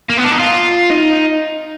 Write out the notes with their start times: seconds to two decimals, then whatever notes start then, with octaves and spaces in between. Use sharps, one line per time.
0.10 A#3
0.17 B3
0.24 D4
0.32 D#4
0.39 F4
0.90 D#4